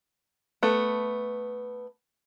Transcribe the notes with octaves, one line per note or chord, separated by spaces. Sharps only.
A3 B3